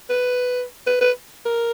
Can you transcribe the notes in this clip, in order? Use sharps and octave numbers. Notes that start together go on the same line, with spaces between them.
B4
B4
B4
A#4